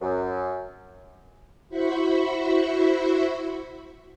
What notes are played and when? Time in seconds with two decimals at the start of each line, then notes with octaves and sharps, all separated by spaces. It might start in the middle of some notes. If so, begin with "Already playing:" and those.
0.02 F#2
1.69 E4 F#4 C5 E5 B5 C#6